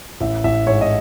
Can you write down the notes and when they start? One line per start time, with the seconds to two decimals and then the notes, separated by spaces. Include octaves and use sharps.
0.21 A1 E5
0.44 A1 E5
0.67 G#2 C#5
0.81 D#5